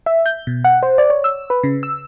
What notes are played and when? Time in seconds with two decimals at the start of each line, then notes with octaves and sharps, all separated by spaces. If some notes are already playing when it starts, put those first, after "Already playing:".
0.06 E5
0.26 G6
0.47 B2
0.65 F#5
0.83 C5
0.98 D5
1.10 C#5
1.24 E6
1.50 B4
1.63 C#3
1.83 E6